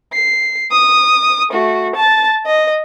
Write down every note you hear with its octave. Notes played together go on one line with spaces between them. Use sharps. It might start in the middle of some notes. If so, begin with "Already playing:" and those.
C7
D#6
A3 F#4
A5 A6
D#5